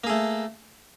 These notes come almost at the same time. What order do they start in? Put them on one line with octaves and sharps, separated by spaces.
A#3 G#4 A3